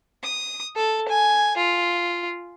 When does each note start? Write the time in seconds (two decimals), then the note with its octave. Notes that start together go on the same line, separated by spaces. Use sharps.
0.23 D#6
0.76 A4
1.08 G#5
1.57 F4